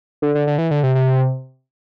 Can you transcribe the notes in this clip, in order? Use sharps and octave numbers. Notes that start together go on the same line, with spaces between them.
D3
D3
D3
E3
D3
C3
C3